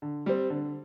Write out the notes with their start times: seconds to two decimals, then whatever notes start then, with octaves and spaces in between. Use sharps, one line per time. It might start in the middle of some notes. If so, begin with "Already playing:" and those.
0.02 D3
0.26 G3 C4
0.50 D3